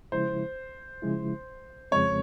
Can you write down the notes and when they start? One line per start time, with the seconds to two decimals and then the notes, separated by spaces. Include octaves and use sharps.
0.12 C#3 F3 G#3 E4 C5
1.02 C#3 F3 G#3 E4
1.92 F2 C#3 F3 G#3 C4 C#5